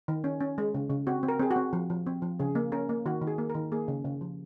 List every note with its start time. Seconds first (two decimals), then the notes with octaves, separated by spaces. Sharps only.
0.08 D#3
0.24 C#4
0.41 C#4
0.58 G#3
0.74 C#3
0.90 C#3
1.07 C4 F#4
1.23 C4
1.28 A#4
1.39 C4 G#4
1.51 F#4
1.56 C4
1.73 F3
1.90 F3
2.07 C4
2.22 F3
2.39 C#3 G#4
2.55 A#3
2.72 C#4 A#4
2.89 A#3
3.06 D#3 F#4
3.22 D#3
3.27 G#4
3.38 A#3
3.50 D#3 A#4
3.72 A#3 G#4
3.88 C#3
4.05 C#3
4.21 F3